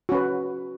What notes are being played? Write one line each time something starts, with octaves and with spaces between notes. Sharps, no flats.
C#4 F#4 B4